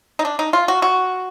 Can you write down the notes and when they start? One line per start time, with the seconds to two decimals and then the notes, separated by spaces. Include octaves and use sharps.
0.19 D#4
0.25 D4
0.39 D#4
0.53 F4
0.68 F#4
0.82 F#4